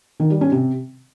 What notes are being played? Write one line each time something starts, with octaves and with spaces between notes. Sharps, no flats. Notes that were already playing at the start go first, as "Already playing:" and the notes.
D#3
G3
C#4
C3